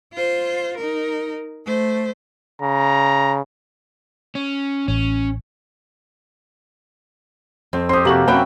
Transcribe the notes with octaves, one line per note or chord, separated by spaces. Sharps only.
F4 C5
D#4 A#4
A3 C5
C#3 A#5
C#4
A1 C#4
F2 C4
C4 G4 C6 D#6
C3 A#3 F#4 A4 F#7
F#2 C4 B4 C#5 E5 G5